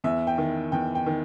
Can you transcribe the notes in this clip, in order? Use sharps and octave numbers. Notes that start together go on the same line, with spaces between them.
E2 E5
G5
D#3
E2 G5
G5
D#3